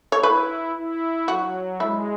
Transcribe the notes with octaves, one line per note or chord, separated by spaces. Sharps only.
C#5
E4 B4
E4
F#3 F#4
G#3 E4